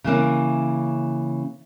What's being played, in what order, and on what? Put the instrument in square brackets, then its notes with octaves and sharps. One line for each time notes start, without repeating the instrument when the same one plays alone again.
[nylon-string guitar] C#3 E3 A#3 C#4